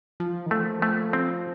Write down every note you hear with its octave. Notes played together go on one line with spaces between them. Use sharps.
F3
D#3
F3 A3
A3
C4